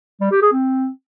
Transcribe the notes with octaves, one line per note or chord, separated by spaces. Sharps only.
G3
G4
G#4
C4